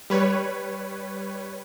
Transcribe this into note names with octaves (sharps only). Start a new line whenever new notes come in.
G3 B4 C#5